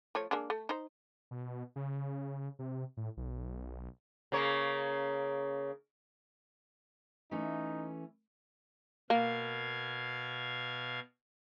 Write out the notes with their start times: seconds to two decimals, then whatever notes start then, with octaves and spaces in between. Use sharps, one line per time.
0.15 F3 A3 C#5
0.31 G#3 A#3 D4
0.50 A3
0.69 D#4 C5
1.31 B2
1.76 C#3
2.59 C3
2.97 A2
3.17 B1
4.32 C#3 A#3 C#5
7.31 E3 A3 C#4 D#4
9.10 B2 A#3 F5 G#6